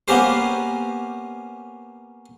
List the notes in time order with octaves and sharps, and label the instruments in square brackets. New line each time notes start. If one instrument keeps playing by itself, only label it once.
[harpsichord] A#3 B3 C#4 G4 A#4 C5